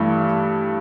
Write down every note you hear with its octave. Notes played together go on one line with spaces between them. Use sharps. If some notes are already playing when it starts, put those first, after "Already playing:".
Already playing: G2 E3 A3